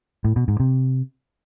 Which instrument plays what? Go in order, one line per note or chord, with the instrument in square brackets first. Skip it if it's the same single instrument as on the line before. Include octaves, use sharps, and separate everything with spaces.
[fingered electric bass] A2
B2
G#2
C3